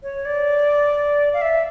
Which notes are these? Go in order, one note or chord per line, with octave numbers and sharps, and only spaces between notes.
C#5
D5
F5
E5